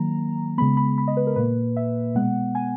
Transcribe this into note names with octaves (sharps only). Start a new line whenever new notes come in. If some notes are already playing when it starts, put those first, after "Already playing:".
Already playing: D#3 F#3 A#3 A#5
C#3 G#3 B3 B5
B5
B5
D#5
B4
A#4
A#2 A#3 B4
E5
B2 G#3 B3 F#5
G#5